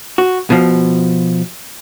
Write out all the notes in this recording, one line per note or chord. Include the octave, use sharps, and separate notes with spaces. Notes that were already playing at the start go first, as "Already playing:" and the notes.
F#4
B2 F3